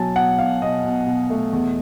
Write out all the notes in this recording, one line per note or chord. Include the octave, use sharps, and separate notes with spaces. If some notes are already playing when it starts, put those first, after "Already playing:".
Already playing: B2 F#3 G#5 A5
B2 F#5
B2 F5
B2 D#5
B2
B2
A3
E2